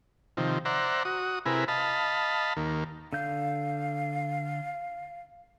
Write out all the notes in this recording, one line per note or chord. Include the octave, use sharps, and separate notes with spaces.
C3 D#3 F3
C5 D5 E5 F#5 A#5
F#4 D#6
C3 E4 G#4 A#4 B4
D#5 F5 A5 B5
D#2 A#3
D3 F5 G6